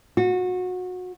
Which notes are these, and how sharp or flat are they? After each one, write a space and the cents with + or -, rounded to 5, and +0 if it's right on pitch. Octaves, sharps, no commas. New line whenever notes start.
F#4 -25